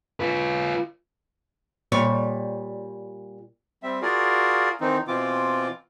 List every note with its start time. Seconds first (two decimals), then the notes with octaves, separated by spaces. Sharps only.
0.20 F4 B4
1.92 A#2 G3 C#5
3.83 G3 C4 E5
4.02 F4 F#4 G#4 A#4 D5 F5
4.81 D#3 E3 C4 D#4
5.08 B2 E3 C4 F4 D6